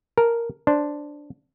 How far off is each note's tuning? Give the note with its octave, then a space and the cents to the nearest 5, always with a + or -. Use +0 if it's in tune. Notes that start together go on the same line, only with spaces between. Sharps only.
A#4 +0 A5 +0
D4 +0 C5 +0